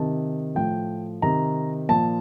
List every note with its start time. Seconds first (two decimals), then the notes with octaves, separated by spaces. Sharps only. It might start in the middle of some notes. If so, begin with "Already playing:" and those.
Already playing: C3 D#3 A5
0.55 A2 F3 G5
1.22 C3 D#3 A#5
1.89 A#2 F3 A5